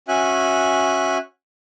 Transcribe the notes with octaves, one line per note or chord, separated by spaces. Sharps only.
C#4 F#4 E5 G#5 F#6